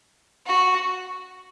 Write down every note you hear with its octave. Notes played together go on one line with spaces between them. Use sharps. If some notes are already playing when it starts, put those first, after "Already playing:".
F#4